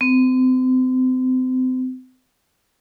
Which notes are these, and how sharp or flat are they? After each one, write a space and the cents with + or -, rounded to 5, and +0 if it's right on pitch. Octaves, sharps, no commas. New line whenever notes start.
C4 -35